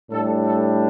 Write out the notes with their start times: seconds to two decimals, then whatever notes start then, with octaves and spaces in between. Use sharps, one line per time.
0.10 A2 G3 D4 A4
0.45 A4